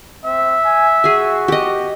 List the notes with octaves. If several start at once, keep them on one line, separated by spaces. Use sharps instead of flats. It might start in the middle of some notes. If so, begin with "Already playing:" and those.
C4 E5
G#5
F#4 G#4 G#5
G4 D#5